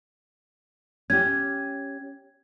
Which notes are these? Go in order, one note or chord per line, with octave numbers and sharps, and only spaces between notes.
C#4 G4 G#6